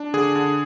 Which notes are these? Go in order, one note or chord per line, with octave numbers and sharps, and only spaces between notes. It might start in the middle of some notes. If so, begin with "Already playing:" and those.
Already playing: D4
D3 G#4
D3